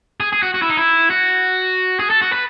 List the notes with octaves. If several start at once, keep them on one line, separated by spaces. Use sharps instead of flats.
G#4
G#4
F#4
F#4
E4
D#4
E4
F#4
G#4
A4
F#4
B4